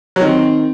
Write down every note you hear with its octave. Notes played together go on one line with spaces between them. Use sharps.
F#3
D#3 C4